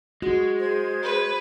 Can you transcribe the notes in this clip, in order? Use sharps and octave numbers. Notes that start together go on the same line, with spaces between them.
G#3 F#4
G#4 C5 G#6
B4